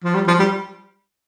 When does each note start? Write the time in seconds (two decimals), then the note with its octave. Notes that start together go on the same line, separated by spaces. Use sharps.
0.04 F3
0.15 G3
0.28 F3
0.39 G3